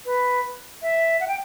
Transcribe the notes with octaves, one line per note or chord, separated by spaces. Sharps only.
B4
E5
F#5
G5